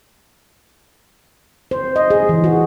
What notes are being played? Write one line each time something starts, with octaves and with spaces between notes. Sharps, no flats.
C5
D#5
G#4
E3
F#4